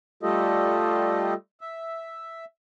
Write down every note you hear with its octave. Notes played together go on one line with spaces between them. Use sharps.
G3 A3 F4 G4 A4 D#5
E5